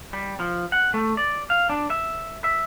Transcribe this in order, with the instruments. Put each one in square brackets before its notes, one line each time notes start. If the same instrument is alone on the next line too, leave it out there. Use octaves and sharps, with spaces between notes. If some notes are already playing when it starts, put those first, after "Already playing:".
[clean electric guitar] G3
F3
F#5
A3
D5
F5
D4
E5
E5